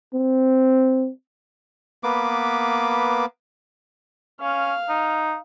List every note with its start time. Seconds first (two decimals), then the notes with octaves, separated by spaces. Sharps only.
0.14 C4
2.03 A#3 B3 B4 D6
4.41 C#4 F5
4.89 D#4